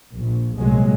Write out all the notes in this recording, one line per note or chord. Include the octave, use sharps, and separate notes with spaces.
A#1
C2 A#2 F#3 G#3